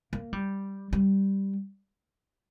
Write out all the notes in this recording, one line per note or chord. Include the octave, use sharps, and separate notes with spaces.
A#3
G3
G3